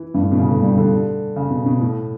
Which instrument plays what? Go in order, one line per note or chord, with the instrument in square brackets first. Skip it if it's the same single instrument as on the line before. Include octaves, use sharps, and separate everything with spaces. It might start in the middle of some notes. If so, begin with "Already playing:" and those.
Already playing: [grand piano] E3
G2
A2
B2
C#3
D3
G3
D3
C#3
B2
B2
A2